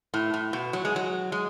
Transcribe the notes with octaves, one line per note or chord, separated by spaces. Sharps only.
A2
A2
B2
F#3
G#3
F#3
G#3